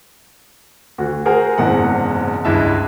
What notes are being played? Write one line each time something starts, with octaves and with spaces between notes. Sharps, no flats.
D2 F#4
G#4 A#4 C5 F#5 G#5
F#1 E2 G#2 C3 F#5
C#2 G2 E4 E5 A5